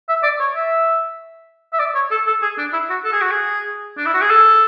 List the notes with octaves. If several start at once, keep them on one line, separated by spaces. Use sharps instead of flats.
E5
D5
C#5
E5
E5
D5
C#5
A4
A4
G#4
D4
E4
F#4
A4
G#4
F#4
G#4
D4
E4
F#4
G#4
A4